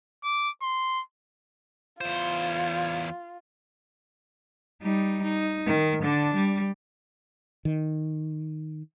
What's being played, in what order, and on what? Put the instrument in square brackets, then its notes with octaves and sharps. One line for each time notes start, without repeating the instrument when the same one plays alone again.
[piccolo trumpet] D6
C6
[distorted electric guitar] E2 C5 [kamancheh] F4
[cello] G3 D#4
D#4
D#3
D3 D4
G3
[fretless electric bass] D#3